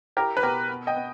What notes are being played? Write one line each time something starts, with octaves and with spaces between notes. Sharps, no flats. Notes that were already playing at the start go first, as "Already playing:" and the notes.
E4 G4 A#4
B4
B2 G4 A#4
B3
D#5 G5
B3